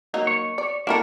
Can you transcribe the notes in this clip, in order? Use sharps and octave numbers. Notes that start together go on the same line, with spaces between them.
F#3 A#3 D#4
C#5
D5
A#3 D4 E4 A4 A#4